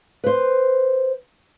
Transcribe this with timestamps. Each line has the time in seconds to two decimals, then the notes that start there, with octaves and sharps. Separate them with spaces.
0.24 B4 C5